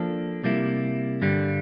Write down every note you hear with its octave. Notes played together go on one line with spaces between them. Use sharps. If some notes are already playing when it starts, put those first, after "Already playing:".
Already playing: F3 A#3 D4 A4
C3 G3 A#3 E4
G2 D3 G3